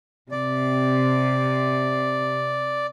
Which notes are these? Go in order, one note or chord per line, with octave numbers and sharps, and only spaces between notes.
C3 D5